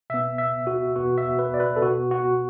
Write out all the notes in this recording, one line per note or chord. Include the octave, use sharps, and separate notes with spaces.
B2 B3 E5
E5
F#4
E2 B2 B3 F#4
E5
B4
D5
B4
A4
B2 B3 F#4
F#4